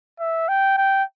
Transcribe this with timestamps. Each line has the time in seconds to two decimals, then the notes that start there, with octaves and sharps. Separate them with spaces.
0.20 E5
0.49 G5
0.77 G5